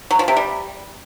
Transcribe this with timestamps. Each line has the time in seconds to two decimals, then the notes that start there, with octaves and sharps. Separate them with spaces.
0.11 F#3
0.19 F3
0.28 C3
0.37 G3